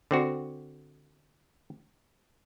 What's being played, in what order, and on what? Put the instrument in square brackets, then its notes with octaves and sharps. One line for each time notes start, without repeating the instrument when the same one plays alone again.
[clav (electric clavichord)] D3 C4 F#4